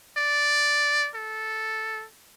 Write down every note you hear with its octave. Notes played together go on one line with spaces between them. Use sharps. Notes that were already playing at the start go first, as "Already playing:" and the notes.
D5
A4